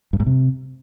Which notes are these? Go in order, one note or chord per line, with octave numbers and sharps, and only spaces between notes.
G2
G#2
C3